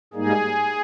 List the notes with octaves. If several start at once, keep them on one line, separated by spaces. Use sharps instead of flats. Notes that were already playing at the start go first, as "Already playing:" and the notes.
G#2 G3 A#3 D#4 G#4